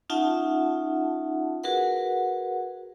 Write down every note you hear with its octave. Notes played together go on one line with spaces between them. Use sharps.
C#4 D#4 F4 E5 F#5 A5
F#4 G#4 A#4 B4 F#5